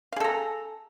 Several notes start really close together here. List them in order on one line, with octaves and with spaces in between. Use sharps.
F5 G#4 A4 A#5